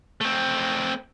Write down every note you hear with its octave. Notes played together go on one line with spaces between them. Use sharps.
A3 C4